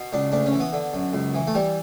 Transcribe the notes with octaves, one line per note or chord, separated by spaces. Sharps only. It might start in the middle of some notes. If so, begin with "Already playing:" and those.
Already playing: B2
C#2 D4
D2 D4
C#4
E3
B3
D3
F#2
C#2
E3
A3
E3 G3